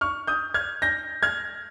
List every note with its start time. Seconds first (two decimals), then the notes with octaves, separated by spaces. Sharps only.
0.01 C#6 F6
0.27 D#6 G6
0.54 F6 G#6
0.82 G6 A#6
1.23 F6 G#6